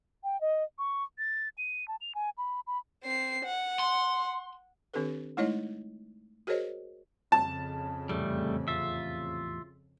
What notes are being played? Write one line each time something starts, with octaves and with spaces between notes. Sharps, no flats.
G5
D#5
C#6
A6
D#7
A5
F7
G#5
B5
B5
C4 C7
F#5
C6
D#3 C4 D4 G4 A4 B4
G#3 A3 D#4 E4 C#5 D#5
F#4 G#4 A#4 C5 C#5 D#5
F2 C#3 A5
E2 A2 C3 G3 A3
F4 E5